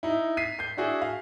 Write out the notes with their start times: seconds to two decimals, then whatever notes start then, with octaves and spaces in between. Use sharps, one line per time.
0.03 D#4 E4
0.37 B6 C7 D#7
0.59 G6 C7
0.77 D4 E4 F#4 G#4
1.02 F5